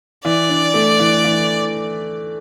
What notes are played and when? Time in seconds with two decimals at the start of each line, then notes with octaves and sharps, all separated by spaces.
0.25 E3 D5
0.49 D4
0.74 A3
0.99 E3
1.24 E3